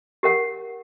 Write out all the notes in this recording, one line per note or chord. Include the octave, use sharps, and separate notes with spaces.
G4 A#4 F#5